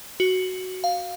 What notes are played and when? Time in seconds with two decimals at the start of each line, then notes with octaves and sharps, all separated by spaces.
0.20 F#4
0.84 F5